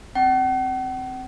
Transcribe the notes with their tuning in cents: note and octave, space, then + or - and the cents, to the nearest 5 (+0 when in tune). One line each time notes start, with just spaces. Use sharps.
C4 +0 F#5 +45